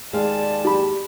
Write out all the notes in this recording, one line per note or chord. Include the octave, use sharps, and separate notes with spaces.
D#2 G#3 D5 F5 G#5 A5
G4 B5